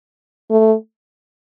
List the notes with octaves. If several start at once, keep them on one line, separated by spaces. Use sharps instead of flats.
A3